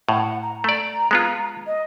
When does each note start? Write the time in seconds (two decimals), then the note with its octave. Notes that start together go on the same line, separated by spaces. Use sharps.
0.09 A2 F#5
0.42 A#5
0.64 A3 D5 A#5
1.11 G#3 B3 F4
1.66 D#5